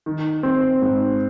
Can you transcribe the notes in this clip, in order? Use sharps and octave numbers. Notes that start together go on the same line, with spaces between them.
D#3
C4
G#2